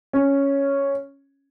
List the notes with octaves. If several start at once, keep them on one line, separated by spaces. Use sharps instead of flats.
C#4